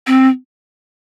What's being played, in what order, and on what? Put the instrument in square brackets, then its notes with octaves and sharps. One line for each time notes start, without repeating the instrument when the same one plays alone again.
[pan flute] C4